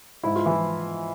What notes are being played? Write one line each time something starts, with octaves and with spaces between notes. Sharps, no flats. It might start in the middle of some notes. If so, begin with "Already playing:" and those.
G#2 E4
F4
E3 F3 E4